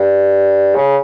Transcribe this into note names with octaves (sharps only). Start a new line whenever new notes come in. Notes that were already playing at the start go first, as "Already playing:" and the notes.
Already playing: G2
C#3